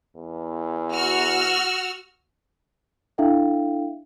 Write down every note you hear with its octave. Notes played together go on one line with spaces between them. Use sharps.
E2
F#4 E6 F6
D4 E4 A4 E5 F5 G5